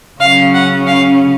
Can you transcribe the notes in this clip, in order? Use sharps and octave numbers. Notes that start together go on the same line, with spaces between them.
C#3 F#3 C#4 F5
F#5
F5